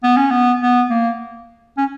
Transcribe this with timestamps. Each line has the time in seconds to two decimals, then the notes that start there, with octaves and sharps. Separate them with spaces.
0.03 B3
0.17 C#4
0.31 B3
0.62 B3
0.90 A#3
1.78 C#4